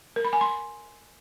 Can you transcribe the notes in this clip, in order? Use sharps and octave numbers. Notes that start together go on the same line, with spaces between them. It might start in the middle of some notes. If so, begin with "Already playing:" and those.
A#4
B5
G#5
C6